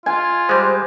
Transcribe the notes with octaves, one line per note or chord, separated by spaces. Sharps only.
F4 G#5
G3 G#3 C5